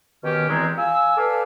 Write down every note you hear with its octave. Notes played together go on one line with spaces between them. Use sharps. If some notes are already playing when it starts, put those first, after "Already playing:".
B2 D#3 C#4 G4 F6
E2 E3 G#3 C4 A#5
F5 G#5 E6
A4 B4 D5 F5 G#5